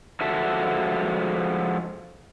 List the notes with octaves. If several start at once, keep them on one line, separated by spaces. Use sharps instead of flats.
F3 G#3 F#4 A4 E5 A5